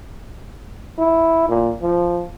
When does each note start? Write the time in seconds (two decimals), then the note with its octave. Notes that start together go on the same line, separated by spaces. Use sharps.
0.98 E4
1.49 A#2
1.82 F3